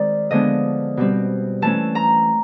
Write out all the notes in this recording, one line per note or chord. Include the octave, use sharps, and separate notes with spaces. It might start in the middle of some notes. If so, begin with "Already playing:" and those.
Already playing: D#3 G#3 C4 D5
D3 F3 G#3 B3 D4 D#5
B2 G3 C4
E3 A3 C#4 A5
A#5